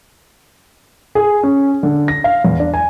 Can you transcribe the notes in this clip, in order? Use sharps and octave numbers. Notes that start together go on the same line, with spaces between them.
G#4
C#4
D3
A#6
F5
E2
D4
G#5